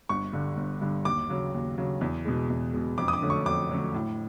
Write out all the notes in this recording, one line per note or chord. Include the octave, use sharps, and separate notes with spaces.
G1 C#6
G2 D3
G1
G2 D3
D#2 D6
C#3 F#3
D#2
C#3 F#3
E2
B2 G#3
E2
B2 G#3
F2 D6
D#6
D6
D3 F#3 A3 C#4
C#6
F2 D6
D3 F#3 A3 C#4
A2